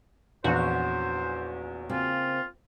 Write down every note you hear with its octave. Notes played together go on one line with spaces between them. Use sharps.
A#1 E2 C#4 F#4 C5
C#3 A#3 C4 F4